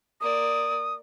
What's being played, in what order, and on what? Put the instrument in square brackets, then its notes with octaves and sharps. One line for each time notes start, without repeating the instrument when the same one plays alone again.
[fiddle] A#3 D5 [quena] D#6